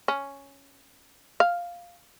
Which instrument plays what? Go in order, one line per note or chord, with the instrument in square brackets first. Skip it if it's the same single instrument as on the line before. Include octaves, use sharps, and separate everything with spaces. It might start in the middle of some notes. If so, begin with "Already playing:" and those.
[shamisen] C#4
F5